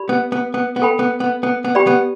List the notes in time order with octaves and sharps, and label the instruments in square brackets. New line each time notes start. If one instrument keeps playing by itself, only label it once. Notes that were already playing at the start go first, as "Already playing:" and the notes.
Already playing: [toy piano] G4 D5 B5
[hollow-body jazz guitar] B3
B3
B3
B3
[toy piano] A4 G5 B5
[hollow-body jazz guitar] B3
B3
B3
B3
[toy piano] G4 D5 G5 B5
[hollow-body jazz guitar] B3